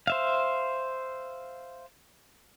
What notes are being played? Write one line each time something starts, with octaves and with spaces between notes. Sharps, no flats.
C5 E5 F5